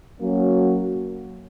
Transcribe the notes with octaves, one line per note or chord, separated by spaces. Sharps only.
F#3 A#3 C#4 F#4